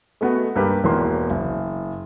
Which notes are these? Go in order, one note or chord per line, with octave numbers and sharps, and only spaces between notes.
G#3 A3 B3 F#4 G#4
G2 A#3 G4 B4
E1 E2 A#3 C6
F#1